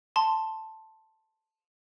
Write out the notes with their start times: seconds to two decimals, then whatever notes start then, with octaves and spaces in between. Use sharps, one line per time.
0.16 A5 C6